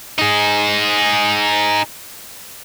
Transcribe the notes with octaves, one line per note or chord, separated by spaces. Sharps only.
D#4 G#4